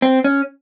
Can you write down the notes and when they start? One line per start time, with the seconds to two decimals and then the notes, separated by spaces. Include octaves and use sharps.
0.02 C4
0.24 C#4